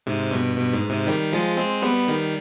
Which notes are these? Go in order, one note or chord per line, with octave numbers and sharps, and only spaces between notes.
G#2 C3
G2 B2
G2 B2
G#2
G#2 C3
D#3 G3
F3 G#3
G#3 C4
G3 B3
D#3 G3